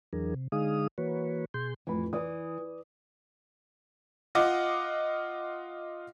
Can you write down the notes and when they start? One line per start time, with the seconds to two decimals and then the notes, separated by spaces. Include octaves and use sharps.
0.13 E2 E3 F#3 D4 G#4 A#4
0.34 C3
0.52 D3 G#3 D#4 G#4 F5 D#6
0.98 E3 A#3 F#4 B4 C#5
1.54 B2 G#4 C6 G6
1.87 A1 F2 E3 B5
2.13 E3 D5 D#6
4.35 F4 D#5 F#5 D6